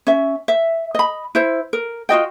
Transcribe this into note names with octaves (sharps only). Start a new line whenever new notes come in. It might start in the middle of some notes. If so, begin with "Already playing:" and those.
C#4 E5
E5
D#5 B5
E4 C5
A#4
F4 F#4 D#5 G5